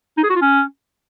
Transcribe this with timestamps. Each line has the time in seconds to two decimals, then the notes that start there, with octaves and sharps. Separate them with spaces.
0.17 D#4
0.23 G#4
0.30 F#4
0.36 F4
0.42 C#4